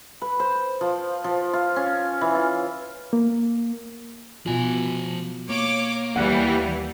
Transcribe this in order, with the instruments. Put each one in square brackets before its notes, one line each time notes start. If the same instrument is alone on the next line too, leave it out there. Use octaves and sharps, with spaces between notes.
[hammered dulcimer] B4
C5
F3
F3
F4
C#4
E3
F4
[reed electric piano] A#3
[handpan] B2 F4 [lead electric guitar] F3 G#5
[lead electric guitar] A#3 [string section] C#5 D6
[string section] D#2 E3 G3 [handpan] F#5